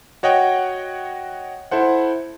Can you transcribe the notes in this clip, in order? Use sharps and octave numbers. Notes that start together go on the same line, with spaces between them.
F#4 C#5 D#5 F#5 G5
E4 A4 C5 F#5